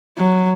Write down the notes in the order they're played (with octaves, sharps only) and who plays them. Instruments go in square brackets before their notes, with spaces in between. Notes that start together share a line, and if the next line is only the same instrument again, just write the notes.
[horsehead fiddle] F#3